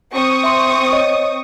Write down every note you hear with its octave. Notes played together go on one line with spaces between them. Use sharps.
C4 C#6 D#6
E5 C6
C#5 D#5